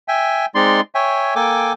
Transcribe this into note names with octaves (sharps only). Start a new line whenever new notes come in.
E5 G5 G#5
G#3 C4 D#4 D5 C6
C#5 E5 G5 G#5
A#3 A4 G5 G#5 D6